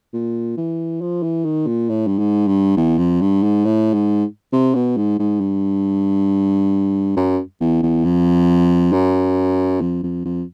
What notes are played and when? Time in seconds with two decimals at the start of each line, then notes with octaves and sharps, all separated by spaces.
0.13 A#2
0.57 E3
1.01 F3
1.23 E3
1.44 D#3
1.67 A#2
1.89 A2
2.07 G2
2.18 G#2
2.47 G2
2.77 E2
2.98 F2
3.21 G2
3.43 G#2
3.65 A2
3.93 G#2
4.52 C3
4.75 B2
4.97 G#2
5.19 G#2
5.40 G2
7.17 F#2
7.60 E2
7.82 E2
8.05 F2
8.93 F#2
9.81 F2
10.03 F2
10.25 F2